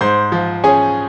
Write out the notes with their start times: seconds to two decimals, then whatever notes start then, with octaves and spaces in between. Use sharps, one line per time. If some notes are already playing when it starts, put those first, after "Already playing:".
0.01 G#2 C5 C6
0.32 F3
0.64 C#4 G#4 G#5